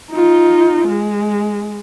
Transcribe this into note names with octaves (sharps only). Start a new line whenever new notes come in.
D#4 F4
G#3